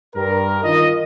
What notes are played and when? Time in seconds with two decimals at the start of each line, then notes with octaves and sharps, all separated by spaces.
0.15 G2 A#4
0.64 D#3 F4 D#5